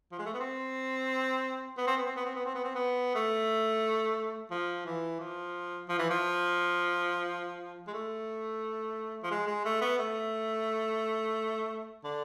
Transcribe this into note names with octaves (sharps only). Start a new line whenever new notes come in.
F3
G#3
A3
B3
C4
B3
C4
B3
C4
B3
C4
B3
C4
B3
C4
B3
A3
F3
E3
F3
F3
E3
F3
G#3
A3
F3
G#3
G#3
A3
B3
A3
D3